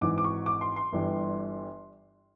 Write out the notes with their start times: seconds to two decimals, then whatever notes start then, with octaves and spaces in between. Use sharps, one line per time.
0.01 G#1 G#2 E3 D6
0.18 D6
0.24 C#6
0.46 D6
0.61 C6
0.76 C6
0.92 G1 G2 E3 G3